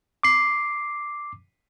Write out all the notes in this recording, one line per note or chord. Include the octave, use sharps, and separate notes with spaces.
D6 C7